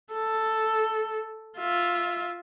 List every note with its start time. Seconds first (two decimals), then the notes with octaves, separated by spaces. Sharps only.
0.12 A4
1.58 F4 E5